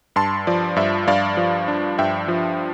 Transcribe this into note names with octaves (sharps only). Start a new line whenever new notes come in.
G2 A5 C6
F3 D5
G2 E5
G2 D5 F5
F3
D4
G2 E5 G5
F3